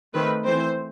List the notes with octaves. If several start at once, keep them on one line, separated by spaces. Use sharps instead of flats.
D#3 A3 C4 B4
E3 A3 C4 C5